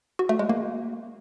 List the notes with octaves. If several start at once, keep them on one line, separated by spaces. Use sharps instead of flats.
F#4
A3
G#3
A#3